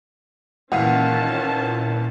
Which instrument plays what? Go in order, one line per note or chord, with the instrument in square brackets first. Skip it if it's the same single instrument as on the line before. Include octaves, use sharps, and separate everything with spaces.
[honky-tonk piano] C#2 E3 F5 [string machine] A#2 [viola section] D#3 C#4 A5 [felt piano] F#5